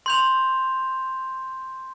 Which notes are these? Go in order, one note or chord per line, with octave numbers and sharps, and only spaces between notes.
C6 G6 F7